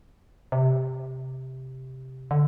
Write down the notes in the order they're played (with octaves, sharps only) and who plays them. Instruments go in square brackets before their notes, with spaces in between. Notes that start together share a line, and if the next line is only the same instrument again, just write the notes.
[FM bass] C3
D3